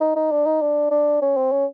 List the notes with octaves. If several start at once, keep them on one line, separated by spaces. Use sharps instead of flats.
D#4
D#4
D4
D#4
D4
D4
C#4
C4
C#4